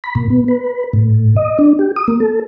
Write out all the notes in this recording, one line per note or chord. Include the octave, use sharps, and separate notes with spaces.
B5
A#2
B3
B4
A2
D#5
D4
G4
D#6
A#3
A4